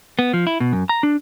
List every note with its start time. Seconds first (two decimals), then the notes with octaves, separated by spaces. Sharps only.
0.19 B3
0.33 F3
0.47 E4
0.60 B2
0.73 F#2
0.89 A#5
1.03 D4